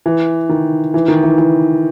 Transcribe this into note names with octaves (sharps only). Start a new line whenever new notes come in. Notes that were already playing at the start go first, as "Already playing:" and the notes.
E3
D#3
E3
D#3
E3
E3